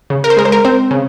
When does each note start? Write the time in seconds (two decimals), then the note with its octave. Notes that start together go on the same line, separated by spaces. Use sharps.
0.10 C#3
0.24 A#4
0.30 C5
0.37 G#3 A#4
0.45 C5
0.52 A#4
0.65 C4 C5
0.91 C#3